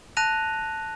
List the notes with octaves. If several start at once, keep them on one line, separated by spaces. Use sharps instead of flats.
A5 F#6 A#6 D#7 F7